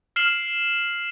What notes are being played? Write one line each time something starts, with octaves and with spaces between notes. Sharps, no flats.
F6 C7 E7 F#7